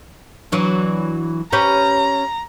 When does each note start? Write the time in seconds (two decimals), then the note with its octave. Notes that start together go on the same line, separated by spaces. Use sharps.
0.52 E3 F#3 D4
1.52 C#4 G4 B4 A#5